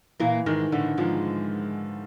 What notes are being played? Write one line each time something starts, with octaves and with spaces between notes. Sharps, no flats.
A#2 E3 A#3
G#2 D#3 G#3
A2 D3 A3
G#2 F3 G#3